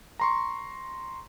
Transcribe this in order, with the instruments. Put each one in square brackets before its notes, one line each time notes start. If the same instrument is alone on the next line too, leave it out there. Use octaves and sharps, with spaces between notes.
[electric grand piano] A#5 C6 C#6